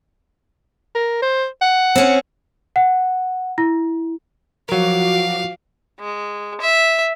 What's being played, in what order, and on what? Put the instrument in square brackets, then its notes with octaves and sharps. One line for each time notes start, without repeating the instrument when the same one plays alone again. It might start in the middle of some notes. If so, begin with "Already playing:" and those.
[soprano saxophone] A#4
C5
F#5
[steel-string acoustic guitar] C4 C#4
[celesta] F#5
E4
[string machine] F3 F#4 D6 [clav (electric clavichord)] F#3 A#4 [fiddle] F5
[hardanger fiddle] G#3
E5